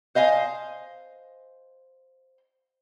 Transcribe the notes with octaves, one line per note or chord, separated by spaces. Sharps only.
C5 D#5 F5 G#5